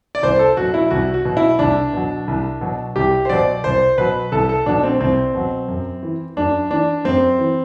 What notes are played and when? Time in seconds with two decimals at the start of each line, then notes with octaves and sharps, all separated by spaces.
0.15 D5
0.22 C2 C5
0.39 A4
0.57 B2 F#3 F#4
0.74 E4
0.91 C2 F#4
1.14 F#4
1.25 B2 F#3
1.37 E4
1.59 C2 D4
1.93 B2 F#3
2.28 C2
2.61 B2 F#3
2.96 C2 G4
3.25 C5
3.29 B2 F#3 D5
3.64 C2 C5
3.98 B2 F#3 B4
4.32 C2 A4
4.49 A4
4.66 B2 F#3 D4
4.83 C4
5.00 C2 C4
5.35 B2 F#3
5.68 F#2
6.03 E3
6.37 F#2 D4
6.71 E3 D4
7.04 F#2 C4
7.39 E3